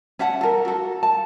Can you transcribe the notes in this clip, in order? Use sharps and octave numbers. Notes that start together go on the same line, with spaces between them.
C#4 E5 F#5 A5
A4 A#4
F#4 A4
A5